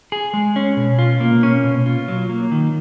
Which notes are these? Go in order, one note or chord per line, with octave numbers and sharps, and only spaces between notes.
G#4
G#3
C#4
B2
F4
A#3
C#4
B2
F4
F#3
A#3
D#3